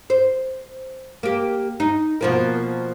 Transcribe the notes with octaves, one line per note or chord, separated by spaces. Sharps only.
C5
A#3 G4
D#4
B2 F3 A#3